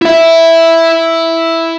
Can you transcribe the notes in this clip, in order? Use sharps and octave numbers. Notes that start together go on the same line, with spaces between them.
E4 E5